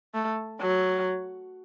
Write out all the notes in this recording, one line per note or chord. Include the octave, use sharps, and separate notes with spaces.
A3
F#3